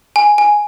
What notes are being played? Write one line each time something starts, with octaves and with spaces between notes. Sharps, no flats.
G#5
G#5